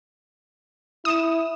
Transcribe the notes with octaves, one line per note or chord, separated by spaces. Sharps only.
E4 D#6 E7